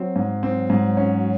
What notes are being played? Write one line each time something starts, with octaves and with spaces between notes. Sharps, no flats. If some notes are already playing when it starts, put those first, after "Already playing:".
Already playing: F#3 C4
G#2
F#3 C4
G#2
C#4